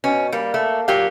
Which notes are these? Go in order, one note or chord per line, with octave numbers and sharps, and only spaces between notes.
B2 C#4
G3 A#3
A3
A#2 F#3 G4 F5